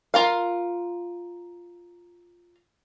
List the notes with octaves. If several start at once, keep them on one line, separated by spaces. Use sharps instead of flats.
F4 A#4 F5